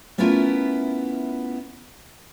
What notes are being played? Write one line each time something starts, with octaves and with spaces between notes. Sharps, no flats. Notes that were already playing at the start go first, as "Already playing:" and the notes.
A3 B3 C#4 E4 F4 A#4